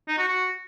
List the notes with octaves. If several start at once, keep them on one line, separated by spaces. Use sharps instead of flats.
D#4
F#4
F#4